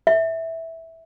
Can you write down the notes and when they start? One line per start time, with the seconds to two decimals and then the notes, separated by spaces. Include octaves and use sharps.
0.07 E5